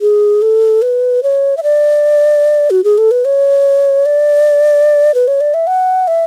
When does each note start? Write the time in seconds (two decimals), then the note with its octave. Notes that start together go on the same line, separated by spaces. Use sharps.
0.01 G#4
0.42 A4
0.82 B4
1.23 C#5
1.57 E5
1.63 D5
2.70 F#4
2.84 G#4
2.98 A4
3.11 B4
3.25 C#5
4.06 D5
5.14 B4
5.28 C#5
5.41 D5
5.54 E5
5.67 F#5
6.08 E5